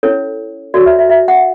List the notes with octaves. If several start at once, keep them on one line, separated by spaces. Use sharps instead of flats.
C#4 E4 A4 C#5
F#4 A4 C#5 D5
E5
E5
E5
F#5